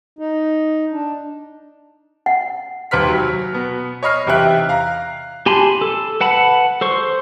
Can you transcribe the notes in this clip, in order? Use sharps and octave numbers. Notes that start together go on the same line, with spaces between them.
D#4
D4
F#5
D#2 C3 B4 C6 F6 B6
F#3
B2 B3
C#5 D#5 B5 F6 C7
E2 C3 D#4 G4 E5 F#6
F5 A#5
G4 G#5 A5 B5 C6
A4
B4 F#5 A5 B5
A4 C5 C#6